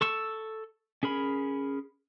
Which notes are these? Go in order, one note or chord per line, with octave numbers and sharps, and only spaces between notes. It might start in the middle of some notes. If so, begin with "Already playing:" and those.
A4 C#6 E6
C#4 G#4 A#4 B5